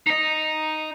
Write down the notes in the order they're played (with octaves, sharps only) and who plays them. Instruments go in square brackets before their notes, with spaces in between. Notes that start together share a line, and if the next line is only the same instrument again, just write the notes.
[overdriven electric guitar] D#4 D#5